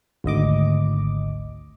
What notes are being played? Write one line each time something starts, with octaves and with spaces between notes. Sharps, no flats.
G#1 D2 D#5 D6